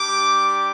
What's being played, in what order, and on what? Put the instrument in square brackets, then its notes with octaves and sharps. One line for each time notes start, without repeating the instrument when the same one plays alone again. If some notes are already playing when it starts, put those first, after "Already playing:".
Already playing: [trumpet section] G3 D4 G4 D6